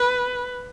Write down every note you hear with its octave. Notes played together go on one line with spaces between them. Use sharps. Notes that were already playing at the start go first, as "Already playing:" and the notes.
Already playing: B4